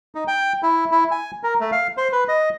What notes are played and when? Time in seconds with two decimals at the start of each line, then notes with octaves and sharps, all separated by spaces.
0.15 D#4
0.28 G5
0.63 E4
0.91 E4
1.11 G#5
1.43 A#4
1.60 A3
1.72 F5
1.97 C5
2.12 B4
2.28 D#5